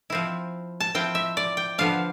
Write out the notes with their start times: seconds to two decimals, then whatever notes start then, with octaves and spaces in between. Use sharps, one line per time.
0.10 F3 C4 E4
0.80 A5
0.95 F3 C4 E4 G5
1.15 E5
1.37 D5
1.57 G5
1.78 D3 F3 B3 D4 F5